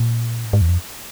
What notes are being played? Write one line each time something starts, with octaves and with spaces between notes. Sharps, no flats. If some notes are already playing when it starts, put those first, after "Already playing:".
Already playing: A#2
A2
G#2
E2
F2